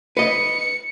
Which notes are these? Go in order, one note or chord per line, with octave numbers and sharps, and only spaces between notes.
B4 D#5 C#7